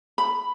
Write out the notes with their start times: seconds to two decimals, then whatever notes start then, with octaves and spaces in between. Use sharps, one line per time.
0.18 B5